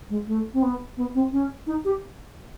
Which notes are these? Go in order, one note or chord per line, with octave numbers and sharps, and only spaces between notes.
G#3
A3
C4
B3
B3
C4
C#4
D#4
G4